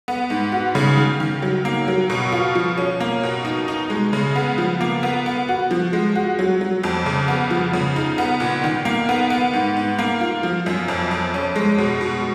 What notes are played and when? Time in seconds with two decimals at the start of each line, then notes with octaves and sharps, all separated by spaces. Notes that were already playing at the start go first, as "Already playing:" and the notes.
0.08 B3
0.30 G#2
0.52 F#4
0.75 C#3
0.97 D#3
1.20 D#3
1.42 F#3
1.65 A#3
1.88 F#3
2.10 B2
2.32 F4
2.55 F3
2.78 C#4
3.00 A#3
3.23 B2
3.45 D#4
3.68 D#4
3.90 G#3
4.13 C#3
4.36 B3
4.58 F3
4.81 A#3
5.03 B3
5.26 B3
5.49 F#4
5.71 F3
5.93 G#3
6.15 F#4
6.39 F#3
6.61 F#3
6.84 F2
7.06 C#3
7.28 B3
7.51 F3
7.73 C#3
7.96 D#4
8.18 B3
8.40 A#2
8.64 D#3
8.85 A#3
9.09 B3
9.30 B3
9.53 G#2
9.77 G#2
9.99 A#3
10.21 F4
10.43 F3
10.66 F#2
10.88 F2
11.11 F2
11.34 C#4
11.56 G#3
11.78 B2
12.01 B2